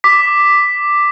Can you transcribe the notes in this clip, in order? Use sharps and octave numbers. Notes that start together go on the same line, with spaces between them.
D6 B6